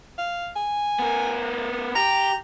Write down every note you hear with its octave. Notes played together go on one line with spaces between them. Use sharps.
F5
G#5
B3 A#4
G4 A#5